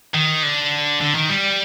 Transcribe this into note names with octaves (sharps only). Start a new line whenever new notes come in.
D#3
D3
D3
D#3
G3